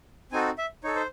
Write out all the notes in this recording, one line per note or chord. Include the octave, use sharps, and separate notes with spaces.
C4 D#4 F#4 A4 G#5
E5
D#4 A4 C#5
C5